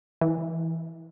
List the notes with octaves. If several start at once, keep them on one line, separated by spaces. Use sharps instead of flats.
E3